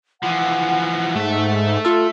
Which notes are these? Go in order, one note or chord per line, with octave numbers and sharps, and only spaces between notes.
E3 F3 F#5
G#2 A3 E5
F4 A4